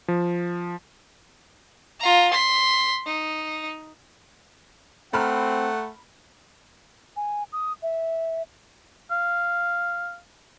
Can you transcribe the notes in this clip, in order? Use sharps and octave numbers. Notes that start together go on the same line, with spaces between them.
F3
F4 A#5
C6 B6
D#4
A3 C4 F#5 A#5 B5 F6
G#5
D#6
E5
F5